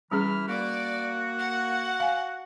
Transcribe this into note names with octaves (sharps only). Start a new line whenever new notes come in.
E3 G3 C#4 G#4 B5 F6
A#3 F#4 D5
F#5
F5 G#5